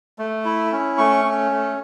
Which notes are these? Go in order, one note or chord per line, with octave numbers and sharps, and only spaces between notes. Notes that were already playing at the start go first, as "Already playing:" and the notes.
A3
E4
C#4
A3 C#6
C#4
A3